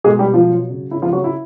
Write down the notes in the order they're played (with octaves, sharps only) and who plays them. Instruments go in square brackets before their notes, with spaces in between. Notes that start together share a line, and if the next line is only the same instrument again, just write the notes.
[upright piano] B2 G#3 G#4
G3 G4
B2
F3 F4
F#3
C#3
C#3 E4
F3 F4
C#3 F#3 F#4
E4